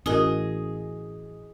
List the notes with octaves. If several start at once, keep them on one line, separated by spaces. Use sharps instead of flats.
A1 C#4 E4 F#4 G#4 A#4 D#5 D#6